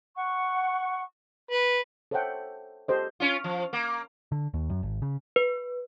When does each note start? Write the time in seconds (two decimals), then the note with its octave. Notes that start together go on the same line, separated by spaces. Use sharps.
0.16 F#5 C#6
1.51 B4
2.11 A4 C5 C#5 E5 F#5 G5
2.88 G4 A4 C5 D#5
3.20 C#4 F4
3.44 F3
3.73 A#3
4.32 D3
4.54 D#2
4.70 F#2
4.83 G#1
5.02 C#3
5.36 B4